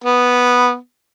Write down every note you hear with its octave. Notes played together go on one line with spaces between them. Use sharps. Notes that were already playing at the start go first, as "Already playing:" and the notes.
B3